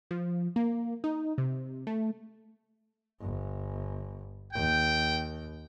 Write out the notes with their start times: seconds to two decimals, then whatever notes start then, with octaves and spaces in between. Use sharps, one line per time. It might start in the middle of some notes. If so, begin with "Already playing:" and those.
0.11 F3
0.56 A#3
1.04 D#4
1.38 C3
1.87 A3
3.21 G1
4.54 D#2 G5